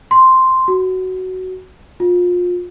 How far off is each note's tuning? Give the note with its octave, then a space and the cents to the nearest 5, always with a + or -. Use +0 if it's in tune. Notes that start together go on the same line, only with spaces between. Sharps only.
C6 +0
F#4 +10
F4 +30